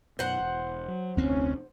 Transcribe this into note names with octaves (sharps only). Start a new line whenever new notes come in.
F#2 B2 C5 F#5
E1
F#3
F1 D2 C4 C#4